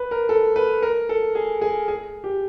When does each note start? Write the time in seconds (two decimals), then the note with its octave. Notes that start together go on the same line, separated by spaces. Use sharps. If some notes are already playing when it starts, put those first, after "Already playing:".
Already playing: B4
0.11 A#4
0.29 A4
0.56 B4
0.82 A#4
1.09 A4
1.35 G#4
1.61 G#4
1.88 G#4
2.24 G4